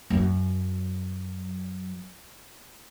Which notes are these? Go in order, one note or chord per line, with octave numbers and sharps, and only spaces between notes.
F#2 F#3